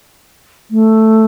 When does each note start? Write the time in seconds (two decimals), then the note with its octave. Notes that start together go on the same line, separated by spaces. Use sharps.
0.71 A3